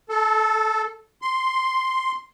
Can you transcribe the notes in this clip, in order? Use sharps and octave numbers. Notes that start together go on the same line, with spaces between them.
A4
C6